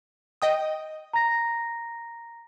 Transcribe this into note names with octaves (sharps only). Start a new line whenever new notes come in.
D#5 G5 D#6
A#5 A#6